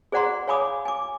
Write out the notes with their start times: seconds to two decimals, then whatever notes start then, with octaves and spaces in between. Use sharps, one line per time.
0.12 G#4 C5 D5 F#5 A#5 C6
0.47 C#5 F5 G#5 B5 D6 D#6
0.85 G#5 D6